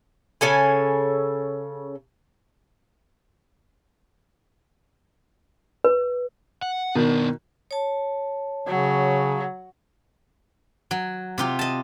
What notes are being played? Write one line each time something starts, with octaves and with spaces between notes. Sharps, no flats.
C#3 C#4 A4 G#5
B4
F#5
B2 D#3 B3 D4
C#5 A5
C#3 F#3
F#3
C3 F4 G4
D#5 A5